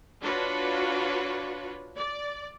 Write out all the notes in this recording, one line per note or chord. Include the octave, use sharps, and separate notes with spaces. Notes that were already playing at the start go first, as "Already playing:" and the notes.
D4 F4 F#4 B4 C#5
D5